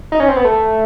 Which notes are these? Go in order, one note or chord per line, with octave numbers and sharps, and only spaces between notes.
D#4
C#4
C4
B3
A3